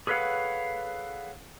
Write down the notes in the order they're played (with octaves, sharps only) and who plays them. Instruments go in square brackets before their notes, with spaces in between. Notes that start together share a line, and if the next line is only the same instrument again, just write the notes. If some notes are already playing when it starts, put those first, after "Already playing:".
[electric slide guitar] G#4 A4 B4 C#5 F5 F#5